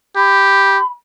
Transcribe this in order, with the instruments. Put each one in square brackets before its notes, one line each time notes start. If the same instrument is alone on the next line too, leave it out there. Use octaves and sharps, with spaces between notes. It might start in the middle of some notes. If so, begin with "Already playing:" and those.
[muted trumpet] G4 [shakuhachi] B5